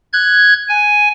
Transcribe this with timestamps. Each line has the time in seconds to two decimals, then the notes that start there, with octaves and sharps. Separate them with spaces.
0.13 F#6 G#6
0.69 G#5